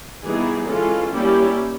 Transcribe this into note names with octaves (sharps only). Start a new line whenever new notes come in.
E3 G3 B3 D#4 G#4
E3 G#3 C#4 F4 A4
G3 A#3 C#4 E4 G4